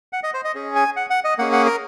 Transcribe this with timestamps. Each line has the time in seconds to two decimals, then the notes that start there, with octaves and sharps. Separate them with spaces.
0.13 F#5
0.23 D#5
0.34 C5
0.45 D#5
0.55 C#4 G#4
0.76 G#5
0.96 F#5
1.10 F#5
1.24 D#5
1.38 A#3 C#4 G#4 F#5
1.52 F#5
1.66 A#4